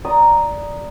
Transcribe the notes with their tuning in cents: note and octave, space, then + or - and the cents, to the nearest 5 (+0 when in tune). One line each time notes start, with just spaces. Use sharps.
D5 +0 A#5 +0 D#6 +0